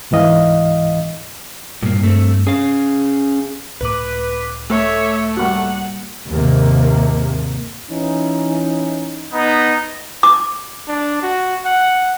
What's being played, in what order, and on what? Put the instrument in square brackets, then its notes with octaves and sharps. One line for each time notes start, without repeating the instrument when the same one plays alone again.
[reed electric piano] C#2 G#2 E3 D#5 F5
[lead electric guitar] G2 A#3 [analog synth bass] A#2
[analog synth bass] G2 [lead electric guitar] A3 C4
[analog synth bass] C#4 [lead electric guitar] G#4 F5
[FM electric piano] C#2 A2 D6 [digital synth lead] B4
[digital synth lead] A3 [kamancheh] C#5 E5
[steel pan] G3 A#3 F#4 [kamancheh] F#5
[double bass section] D#2 G#2 C3 A#3
[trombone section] E3 C#4 D#4
[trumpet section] B3 D#4
[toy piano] D6
[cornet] D4
F#4
F#5